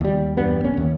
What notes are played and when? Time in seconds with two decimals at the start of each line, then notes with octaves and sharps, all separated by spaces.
0.01 D#2 G3
0.37 E2 G2 G3 B3
0.64 D1 A#3 C#4
0.77 D#2